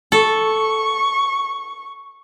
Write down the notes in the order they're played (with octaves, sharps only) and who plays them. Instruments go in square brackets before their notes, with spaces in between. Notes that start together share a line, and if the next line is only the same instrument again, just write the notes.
[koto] A4 [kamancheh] C#6